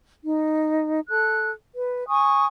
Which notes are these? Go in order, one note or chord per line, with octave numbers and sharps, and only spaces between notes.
D#4
A4 F#6
B4
G#5 C#6 D#6